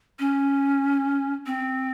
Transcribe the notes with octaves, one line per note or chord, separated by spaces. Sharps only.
C#4
C4